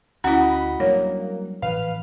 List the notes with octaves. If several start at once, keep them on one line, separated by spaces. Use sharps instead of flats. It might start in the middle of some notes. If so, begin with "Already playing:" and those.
D2 C#4 E4 F#4 D#5 B5
F#3 G3 A#3 D4 C#5
A2 E3 F3 B4 F5 F6